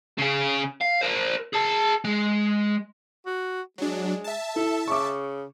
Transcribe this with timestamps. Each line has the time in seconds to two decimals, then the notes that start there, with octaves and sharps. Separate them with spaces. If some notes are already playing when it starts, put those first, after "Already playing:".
0.19 C#3 G#4
0.81 F5
1.02 A#4 C5
1.53 G#4 A5
2.05 G#3
3.26 F#4
3.78 F#3 G#3 D4
4.24 E5 A5
4.56 E4 A4
4.88 C#3 C#6 D6